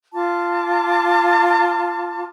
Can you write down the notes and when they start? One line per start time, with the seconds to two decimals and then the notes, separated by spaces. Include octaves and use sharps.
0.14 F4 A5 D6